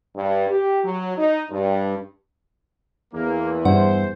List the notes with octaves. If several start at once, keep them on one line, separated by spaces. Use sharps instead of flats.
G2
G4
F#3
D#4
G2
E2 E3 A#3
G2 C5 F#5